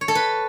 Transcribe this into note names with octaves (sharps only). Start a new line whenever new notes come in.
C#5
A4
B4